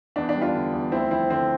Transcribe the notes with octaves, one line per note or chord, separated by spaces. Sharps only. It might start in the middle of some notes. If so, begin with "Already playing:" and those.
E2 D4
D4
G3
D4 F4
D3
E2
D2 C4 E4
F3 C4 E4
D3 C4